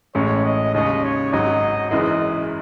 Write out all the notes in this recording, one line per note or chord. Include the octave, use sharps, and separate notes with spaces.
A1 A2 G#3 C#4 C#5
D#5
D#2 C#3 G#3 C#4 D#5
C#5
G#1 G#2 F#3 D#5
F#1 F#2 E3 G#3 D#5